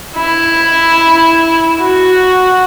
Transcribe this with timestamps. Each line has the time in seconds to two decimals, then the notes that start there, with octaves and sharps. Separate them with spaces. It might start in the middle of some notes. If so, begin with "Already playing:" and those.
0.17 E4
1.81 F#4